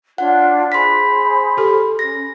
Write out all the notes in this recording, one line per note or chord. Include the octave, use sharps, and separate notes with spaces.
D4 F4 C#5 F#5
G#4 C5 B5 C6 B6
G4 A4
C#4 A#6